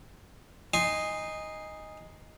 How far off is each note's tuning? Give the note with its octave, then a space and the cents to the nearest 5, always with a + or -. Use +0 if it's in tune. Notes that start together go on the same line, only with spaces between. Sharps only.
D#4 +0 G#5 -20 C6 +0